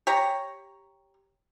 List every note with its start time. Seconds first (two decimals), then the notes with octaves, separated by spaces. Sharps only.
0.07 G4 C#5 A#5